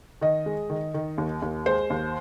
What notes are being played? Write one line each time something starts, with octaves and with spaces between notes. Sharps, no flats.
D#3 D#5
G#3
D#3
D#3
D#2
D#2
G#3 C5
D#2